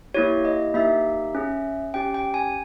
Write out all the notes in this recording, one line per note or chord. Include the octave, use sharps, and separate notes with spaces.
A#3 E4 G4 C#5
D#5
A#3 D#4 G4 E5
C#4 G#4
C#4 G4 G5
G5
G#5